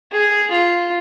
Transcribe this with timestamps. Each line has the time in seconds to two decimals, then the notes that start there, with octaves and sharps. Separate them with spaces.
0.12 G#4
0.51 F4